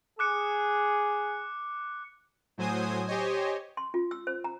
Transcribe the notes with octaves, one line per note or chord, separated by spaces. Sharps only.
G#4 D6 F#6 C#7
A2 F#3 C5 G#5 D#6
G4 C5 C#5 D#5 G#5
C6
F4
E6
C5
A#5